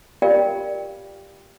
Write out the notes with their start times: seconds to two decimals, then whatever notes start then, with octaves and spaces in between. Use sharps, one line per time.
0.22 F4 G4 A#4 D5 F5 G5